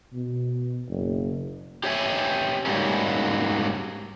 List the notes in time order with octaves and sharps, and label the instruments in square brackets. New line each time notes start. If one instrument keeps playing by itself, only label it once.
[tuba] B2
F#1
[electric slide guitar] G4 C#5 E5 G#5
G#2 F#3 G3 A#3 C#4